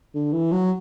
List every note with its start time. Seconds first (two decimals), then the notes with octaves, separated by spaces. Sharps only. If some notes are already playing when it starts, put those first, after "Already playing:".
0.15 D3
0.33 E3
0.52 F#3